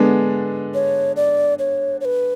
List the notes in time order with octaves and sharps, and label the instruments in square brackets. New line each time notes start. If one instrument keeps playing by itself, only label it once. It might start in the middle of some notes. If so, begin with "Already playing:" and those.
Already playing: [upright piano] D3 G#3 B3 D4
[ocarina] C#5
D5
C#5
C#5
B4